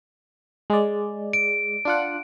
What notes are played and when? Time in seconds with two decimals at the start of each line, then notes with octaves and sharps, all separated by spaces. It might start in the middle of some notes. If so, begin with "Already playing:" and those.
0.70 G#3 D5
1.33 D7
1.85 D4 F4 F#5